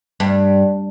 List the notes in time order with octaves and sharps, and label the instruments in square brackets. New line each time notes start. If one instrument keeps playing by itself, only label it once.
[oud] G2